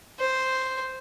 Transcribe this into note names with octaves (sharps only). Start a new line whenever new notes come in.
C5